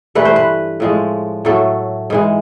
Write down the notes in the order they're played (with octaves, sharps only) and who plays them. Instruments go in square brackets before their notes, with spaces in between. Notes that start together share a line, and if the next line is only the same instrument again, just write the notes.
[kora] G2 E3 A3 B4
C5
B4
A2 F3 G#3
A2 F#3 A3 A4
G#2 E3 G#3